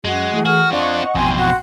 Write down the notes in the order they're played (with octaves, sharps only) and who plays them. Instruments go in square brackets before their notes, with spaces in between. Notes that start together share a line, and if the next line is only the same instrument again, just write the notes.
[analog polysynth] F#2 [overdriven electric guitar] G#3 [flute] F#4
[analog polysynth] E3 A3 G#4
[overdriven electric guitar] F#4 [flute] F6
[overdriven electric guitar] C4 F4 [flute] D4 [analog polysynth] D#5 F#5 C#6
[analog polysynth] A1 G5 C6 [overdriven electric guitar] F2 B2 [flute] G#5
[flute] F#4